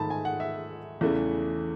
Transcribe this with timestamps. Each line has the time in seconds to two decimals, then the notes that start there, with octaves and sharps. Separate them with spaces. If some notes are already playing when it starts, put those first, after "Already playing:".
Already playing: G#2 D#3 A3 A5 B5
0.10 G#5
0.25 F#5
0.40 E5
1.01 E2 C#3 E3 A3